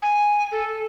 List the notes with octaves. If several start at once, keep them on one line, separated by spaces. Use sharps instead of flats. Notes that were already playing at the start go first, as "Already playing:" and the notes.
G#5
A4